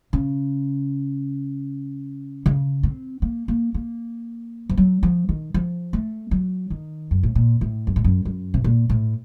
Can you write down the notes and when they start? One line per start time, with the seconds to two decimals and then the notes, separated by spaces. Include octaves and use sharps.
0.13 C#3
2.46 C#3
2.83 C4
3.22 A#3
3.48 A#3
3.74 A#3
4.69 F3
4.77 F#3
5.03 F3
5.29 D#3
5.54 F3
5.93 A3
6.31 F#3
6.70 D#3
7.11 F#2
7.23 A2
7.35 A#2
7.61 A2
7.87 F#2
7.96 A2
8.04 F#2
8.25 F#2
8.54 C3
8.64 A#2
8.90 A2